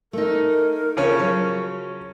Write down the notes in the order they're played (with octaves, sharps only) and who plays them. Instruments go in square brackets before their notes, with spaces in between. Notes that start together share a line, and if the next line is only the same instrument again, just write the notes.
[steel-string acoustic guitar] A3 D#4 [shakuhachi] A#4
[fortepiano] C#3 F3 C#4
[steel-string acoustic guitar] F#3